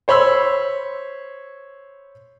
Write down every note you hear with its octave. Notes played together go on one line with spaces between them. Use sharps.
C5 C#5 B5 C6 E6